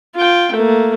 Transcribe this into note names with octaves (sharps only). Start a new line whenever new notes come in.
F4 G5
A3 A#3